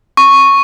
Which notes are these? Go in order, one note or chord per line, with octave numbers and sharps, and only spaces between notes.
C#6